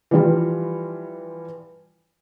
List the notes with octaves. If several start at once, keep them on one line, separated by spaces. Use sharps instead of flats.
E3 F3 G3 F4